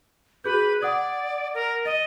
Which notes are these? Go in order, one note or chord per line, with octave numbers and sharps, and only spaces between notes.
F#4 G#4 B4 G6
D5 F#5 D#6 G#6
A#4
D#5 A6